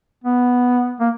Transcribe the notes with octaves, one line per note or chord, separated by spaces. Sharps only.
B3
A#3